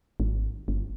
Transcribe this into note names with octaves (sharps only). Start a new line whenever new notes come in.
G#1
G1